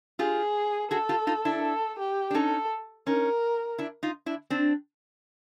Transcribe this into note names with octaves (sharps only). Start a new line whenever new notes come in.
F4 G4 G#4
F#4 G#4 A4
F4 G4
D#4 F4
D4 E4
A4
G4
D4
C#4 D#4 A4
C#4 D#4 A#4
D4 E4
D#4 F4
D4 E4
C4 D4